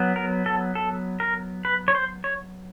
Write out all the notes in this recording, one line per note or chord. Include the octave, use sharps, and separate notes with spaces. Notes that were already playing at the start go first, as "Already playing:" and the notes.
Already playing: F#3 B3
A#4
A4
A4
A#4
B4
C#5
C5
C#5